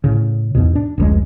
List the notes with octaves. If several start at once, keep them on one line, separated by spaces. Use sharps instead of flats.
A2 C#3
E2 G#2 B2
D4
F1 C#2 G#3